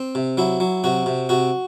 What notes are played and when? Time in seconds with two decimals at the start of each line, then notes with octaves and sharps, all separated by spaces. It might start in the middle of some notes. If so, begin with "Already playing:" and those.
Already playing: C4
0.15 C3
0.37 F#3 E4
0.60 F#3
0.84 C3 F#4
1.06 C3
1.29 C3 F#4